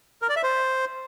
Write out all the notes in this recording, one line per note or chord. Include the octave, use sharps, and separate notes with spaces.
A#4
D5
E5
C5